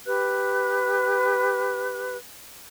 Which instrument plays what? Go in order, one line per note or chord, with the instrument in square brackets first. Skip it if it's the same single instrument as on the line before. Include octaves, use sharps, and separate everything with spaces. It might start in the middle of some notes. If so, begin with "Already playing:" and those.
[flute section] G4 B4 F#6